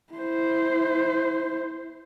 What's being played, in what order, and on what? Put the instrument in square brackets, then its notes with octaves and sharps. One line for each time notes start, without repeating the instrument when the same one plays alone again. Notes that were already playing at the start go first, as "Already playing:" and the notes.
[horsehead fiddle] E4 C5